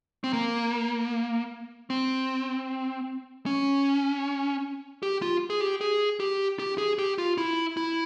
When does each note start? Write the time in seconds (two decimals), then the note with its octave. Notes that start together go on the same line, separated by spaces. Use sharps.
0.24 C4
0.33 A#3
1.90 C4
3.46 C#4
5.03 G4
5.22 F4
5.50 G#4
5.61 G4
5.81 G#4
6.20 G4
6.59 G4
6.78 G#4
6.99 G4
7.18 F4
7.38 E4
7.77 E4